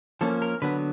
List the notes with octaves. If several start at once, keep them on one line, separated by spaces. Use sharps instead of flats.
F3 A#3 C#4 A4
A#4
D3 F#3 B3 B4